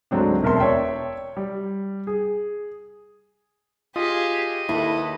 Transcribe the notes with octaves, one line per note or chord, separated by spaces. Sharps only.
D2 G#2 F#3 C4 D4
E1 B2 A#4 E5 A5 C6
C#5 D5 E5 G5
G3
G#4
F4 G4 G#4 D#5
D#2 E4 A4 B4